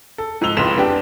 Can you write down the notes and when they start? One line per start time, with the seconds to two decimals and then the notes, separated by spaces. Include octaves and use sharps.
0.18 A4
0.41 G#2 F3 E6 F7 G7
0.57 F1 C#2 A2 C6 B6 E7
0.77 B3 D4 G4